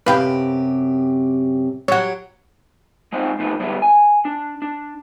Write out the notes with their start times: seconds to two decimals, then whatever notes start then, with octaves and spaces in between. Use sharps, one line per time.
0.06 F#2 C3 G4 B4 F5 G5
1.88 F#3 G4 C#5 F#5
3.13 G#3 C4 D#4 F4 C5 D#5
3.39 B2 F3 A3 D#4 B4
3.60 G2 D3 G3 G#3 B3 E4
3.82 G#5
4.25 D4
4.62 D4